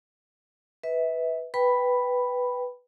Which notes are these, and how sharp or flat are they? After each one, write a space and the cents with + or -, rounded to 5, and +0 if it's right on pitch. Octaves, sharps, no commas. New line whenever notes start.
B4 +0 E5 -30
B4 +0 G5 +0 B5 +0